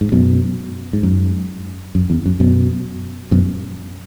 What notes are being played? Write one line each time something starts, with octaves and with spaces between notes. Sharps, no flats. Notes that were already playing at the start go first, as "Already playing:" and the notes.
G#2
F#2 B2
G#2
F#2
F#2
E2
F#2
F#2 B2
F#2 B2